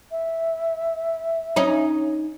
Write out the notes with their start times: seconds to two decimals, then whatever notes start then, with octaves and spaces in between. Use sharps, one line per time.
0.11 E5
1.56 C#4 D#4